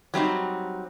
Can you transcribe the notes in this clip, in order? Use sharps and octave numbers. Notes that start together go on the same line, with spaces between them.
F#3 G3 C4 D#4